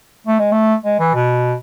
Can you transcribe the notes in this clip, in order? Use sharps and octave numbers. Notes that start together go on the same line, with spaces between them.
A3
G#3
A3
G#3
E3
B2